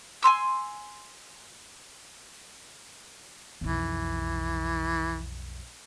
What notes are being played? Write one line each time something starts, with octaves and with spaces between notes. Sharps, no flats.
G#5 A#5 C6 E6
B1 F2 E3